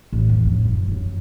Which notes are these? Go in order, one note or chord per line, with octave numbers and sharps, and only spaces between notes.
A1
F2
A2
F#2
F#2 F#3